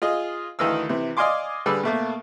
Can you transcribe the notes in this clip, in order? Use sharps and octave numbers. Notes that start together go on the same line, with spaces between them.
F4 G#4 D#5
D2 D#3 E3 D#4 F5 E6
C3 E3
D5 D#5 F5 G#5 C6 D6
D3 G3 G#4 B4 D5 E6
B2 A3 A#3